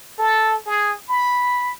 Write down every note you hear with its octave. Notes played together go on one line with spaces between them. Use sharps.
A4
G#4
B5